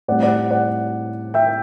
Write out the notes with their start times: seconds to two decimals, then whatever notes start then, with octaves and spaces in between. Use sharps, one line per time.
0.08 A2 G3 C4 E4 D5 F#5
0.22 D5 F#5
0.51 D5 F#5
1.34 E5 G5